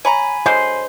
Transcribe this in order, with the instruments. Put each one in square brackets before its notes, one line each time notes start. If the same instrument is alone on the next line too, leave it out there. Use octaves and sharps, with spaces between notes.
[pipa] C#5 A#5 [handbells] G#5 B5
[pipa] D3 F#3 G#3 [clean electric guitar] C5